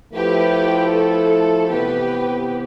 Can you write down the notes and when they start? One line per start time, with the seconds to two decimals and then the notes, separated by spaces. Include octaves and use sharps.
0.14 F3 A3 E4 G4 B4
0.91 A4
1.69 C3 E3 B3 G4 B4